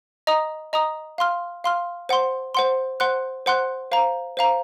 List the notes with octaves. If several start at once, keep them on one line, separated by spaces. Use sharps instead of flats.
D#5 A#5 D#6
D#5 A#5 D#6
F5 C6 F6
F5 C6 F6
C5 F#5 C6
C5 F#5 C6
C5 F#5 C6 F#6
C5 F#5 C6 F#6
C5 F5 A#5
C5 F5 A#5